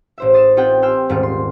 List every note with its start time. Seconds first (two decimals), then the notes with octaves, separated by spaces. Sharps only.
0.18 A1 C5 E5
0.34 D#6 A6 C7 D#7 E7
0.57 C4 D#4 F4 G4 F#5 G5
0.82 G5 G#5 C6 E6 F6 G6
1.09 D#1 G#2 A3 F4
1.23 C6